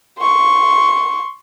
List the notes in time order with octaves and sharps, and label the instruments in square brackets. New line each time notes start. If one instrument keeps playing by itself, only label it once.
[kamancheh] C6 C#6